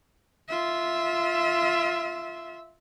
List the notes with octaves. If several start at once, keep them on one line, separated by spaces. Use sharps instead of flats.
F4 E5